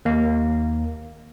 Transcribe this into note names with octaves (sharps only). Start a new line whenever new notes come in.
D#2 A#3